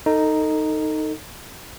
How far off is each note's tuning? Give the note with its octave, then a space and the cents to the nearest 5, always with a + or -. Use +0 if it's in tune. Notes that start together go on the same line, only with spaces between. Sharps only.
D#4 +0 A4 +30